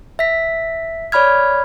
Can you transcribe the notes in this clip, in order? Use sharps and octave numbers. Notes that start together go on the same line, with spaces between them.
E5 B6
C#5 D5 B5 F6 G#6